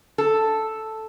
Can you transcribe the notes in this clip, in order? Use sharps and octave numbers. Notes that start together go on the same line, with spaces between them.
A4